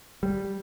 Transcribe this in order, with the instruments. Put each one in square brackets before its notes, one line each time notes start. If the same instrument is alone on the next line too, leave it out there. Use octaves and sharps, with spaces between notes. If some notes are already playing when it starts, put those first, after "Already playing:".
[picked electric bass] G3